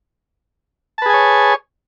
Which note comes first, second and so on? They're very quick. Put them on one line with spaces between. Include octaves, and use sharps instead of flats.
A5 B4 G#4 G#5 C#5